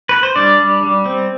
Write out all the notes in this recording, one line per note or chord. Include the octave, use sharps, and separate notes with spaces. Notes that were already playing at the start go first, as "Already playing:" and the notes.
B4
C5
G3 D4 D5
G3
G3
C4